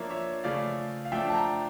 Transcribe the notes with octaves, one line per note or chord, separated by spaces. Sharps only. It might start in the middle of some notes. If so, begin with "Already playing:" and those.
Already playing: F3 A#3 D4 C#5 E5
C#5 E5
C#3 F3 A3 D5 F5
F5
F3 A3 D4 E5 G5
A5
G5 A#5